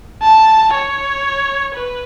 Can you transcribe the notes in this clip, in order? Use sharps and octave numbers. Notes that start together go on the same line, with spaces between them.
A5
C#5
B4